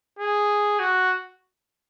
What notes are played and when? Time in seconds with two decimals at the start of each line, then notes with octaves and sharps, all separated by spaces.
0.19 G#4
0.79 F#4